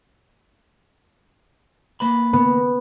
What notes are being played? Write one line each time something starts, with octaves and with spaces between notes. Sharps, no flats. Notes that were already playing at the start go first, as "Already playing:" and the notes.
A#3 B4 B5
B3